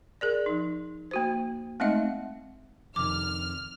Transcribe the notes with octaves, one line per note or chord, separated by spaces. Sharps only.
G#4 A#4 D5
F3 D#4
A#3 F#4 C5
G#3 A3 C4 D#4 D#5 E5
F2 C3 D#3 D6 F6